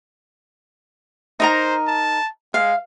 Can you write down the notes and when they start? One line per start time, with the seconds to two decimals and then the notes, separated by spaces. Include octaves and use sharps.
1.40 D#4 A#4 C5 A#5
1.87 A5
2.54 G#3 F5